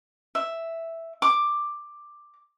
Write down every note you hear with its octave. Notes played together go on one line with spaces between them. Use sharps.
E5
D6